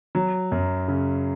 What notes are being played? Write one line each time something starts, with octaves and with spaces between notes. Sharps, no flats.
F#3
F#2
C#3